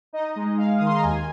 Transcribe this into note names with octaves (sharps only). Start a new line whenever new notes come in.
D#4 D#5
G#3
G#3 F5
D#3 D#6
C6
A#5
D#2 G#5